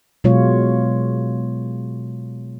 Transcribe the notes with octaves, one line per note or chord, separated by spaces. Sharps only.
B2 F#3 G#3 F4 C#5